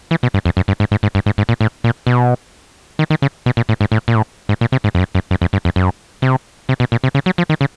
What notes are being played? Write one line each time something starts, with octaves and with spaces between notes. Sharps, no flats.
E3
B2
G2
F2
F#2
G2
G#2
G#2
G#2
G2
G#2
G#2
A#2
A2
A#2
B2
D#3
D#3
C#3
B2
A#2
A2
G#2
A2
A#2
A2
G#2
A#2
C3
G#2
F2
F#2
F#2
F#2
F2
G2
F2
F#2
C3
C3
B2
A#2
C3
C#3
F#3
F3
D#3
C#3